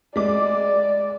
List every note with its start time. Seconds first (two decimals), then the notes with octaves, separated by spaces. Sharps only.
0.16 G#3 D5 D6